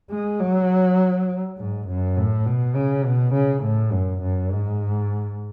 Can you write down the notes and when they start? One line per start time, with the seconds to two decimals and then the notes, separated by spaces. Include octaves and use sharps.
0.11 G#3
0.40 F#3
1.58 G#2
1.88 F#2
2.16 A2
2.46 B2
2.75 C#3
3.05 B2
3.34 C#3
3.63 A2
3.93 F#2
4.22 F#2
4.52 G#2